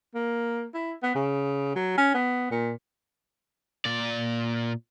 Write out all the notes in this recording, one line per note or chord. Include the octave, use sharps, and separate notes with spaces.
A#3
E4
B3
C#3
F#3
C#4
B3
A#2
A#2 D5